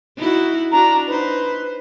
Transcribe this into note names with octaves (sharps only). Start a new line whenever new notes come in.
D#4 E4 F#4
D4 F#4 A#5
D#4 B4 C5